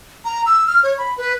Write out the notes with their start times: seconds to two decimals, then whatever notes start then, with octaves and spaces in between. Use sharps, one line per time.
0.25 A#5
0.46 E6
0.67 F6
0.83 C#5
0.98 B5
1.18 B4